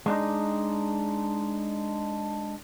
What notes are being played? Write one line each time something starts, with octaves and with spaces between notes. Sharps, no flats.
G#3 D4 D#4